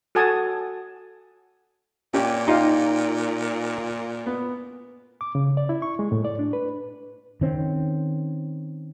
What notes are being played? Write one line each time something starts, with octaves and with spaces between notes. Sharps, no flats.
F#4 A4 G#5 A5 D#6
A#2 C#4 G4
D#4 F4 G4 F5
B3
D6
C#3
D5
E4
C#6
G#3
A2
D5
D4
B4
D#3 C4 C#4